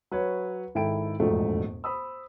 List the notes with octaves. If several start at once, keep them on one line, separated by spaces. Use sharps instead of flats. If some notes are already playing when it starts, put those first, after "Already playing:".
F#3 B4 C#5
G#1 G#2 E4 A4 G5 D7
E1 A#1 F2 G#2 B2 A3
C5 B5 D#6 E6